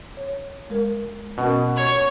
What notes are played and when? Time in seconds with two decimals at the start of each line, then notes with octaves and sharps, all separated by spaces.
0.17 C#5
0.70 G#3 A#4
1.38 B2 C#4 A#4
1.77 C#5